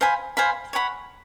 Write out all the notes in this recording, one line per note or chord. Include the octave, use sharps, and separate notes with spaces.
C5 F5 G#5 B5
C5 F5 G#5 B5
C#5 F#5 B5